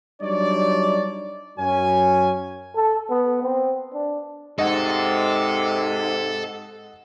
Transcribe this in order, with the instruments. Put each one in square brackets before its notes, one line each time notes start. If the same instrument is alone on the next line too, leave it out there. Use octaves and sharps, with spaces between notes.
[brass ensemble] F#3 G3 D4 D#4 C#5 D5
F#2 F#3 C#4 G#5
[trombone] A4
B3
C4
D4
[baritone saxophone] G#2 [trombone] C3 [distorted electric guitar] A4 [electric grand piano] D#5 F#5